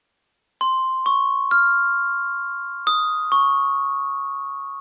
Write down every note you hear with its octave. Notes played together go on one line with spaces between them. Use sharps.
C6
C#6
F6
D#6
C#6